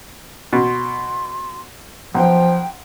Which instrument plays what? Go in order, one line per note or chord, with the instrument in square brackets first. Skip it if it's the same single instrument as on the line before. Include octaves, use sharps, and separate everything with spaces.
[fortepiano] B2 [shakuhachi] C6
[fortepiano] B1 [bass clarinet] F3 [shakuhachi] G5